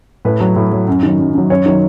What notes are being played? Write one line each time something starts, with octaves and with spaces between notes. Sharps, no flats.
A2 B4
F#3
A2
F#3
F#2
D#3 F#3
F#2
D#3 F#3
F#2 C#5
D#3 F#3